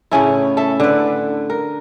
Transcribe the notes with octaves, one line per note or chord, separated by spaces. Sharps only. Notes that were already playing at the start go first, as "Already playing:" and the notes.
A2 C#3 C#4 E4
A4 E5
D3 B4
A#4